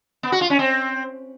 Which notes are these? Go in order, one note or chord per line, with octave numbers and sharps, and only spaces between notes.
B3
F#4
F4
C#4
C4